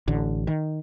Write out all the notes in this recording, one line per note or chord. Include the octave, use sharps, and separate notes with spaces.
A1 D3
D#3